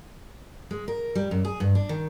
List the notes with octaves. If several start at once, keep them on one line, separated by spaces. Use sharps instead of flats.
G#3
A#4
G3
F#2
G#4
G2
D4
D#3